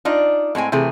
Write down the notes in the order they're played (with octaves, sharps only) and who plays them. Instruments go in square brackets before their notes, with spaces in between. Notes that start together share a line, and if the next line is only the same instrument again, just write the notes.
[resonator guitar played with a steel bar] D4 D#4 F4
A2 G#3 C4 G#5
C3 E3 A3 G#4